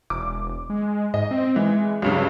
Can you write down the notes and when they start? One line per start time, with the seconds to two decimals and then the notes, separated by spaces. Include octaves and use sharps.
0.10 E1 D6
0.70 G#3
1.14 G#2 D#5
1.31 C4
1.56 E3 G#3
2.02 C#2 G2 C#3 F#3